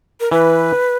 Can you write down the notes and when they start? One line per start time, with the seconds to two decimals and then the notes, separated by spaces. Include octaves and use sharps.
0.20 A#4
0.31 E3 B4